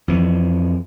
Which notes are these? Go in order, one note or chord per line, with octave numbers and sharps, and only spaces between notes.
F2 E3